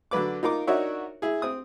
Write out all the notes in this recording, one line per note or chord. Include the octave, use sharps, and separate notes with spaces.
D3 F#3 B4 D6
D#4 F4 A#4 D6
D4 D#4 F#4 A#4 C#5 E5
E4 G#4
C4 D#6